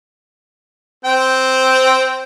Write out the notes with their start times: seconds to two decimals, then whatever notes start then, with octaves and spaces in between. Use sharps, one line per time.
1.05 C4 G5